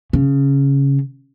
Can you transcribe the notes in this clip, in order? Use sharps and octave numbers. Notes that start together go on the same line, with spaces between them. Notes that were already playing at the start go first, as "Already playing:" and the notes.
C#3